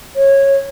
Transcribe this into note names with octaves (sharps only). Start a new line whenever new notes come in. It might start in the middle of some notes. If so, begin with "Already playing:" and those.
C#5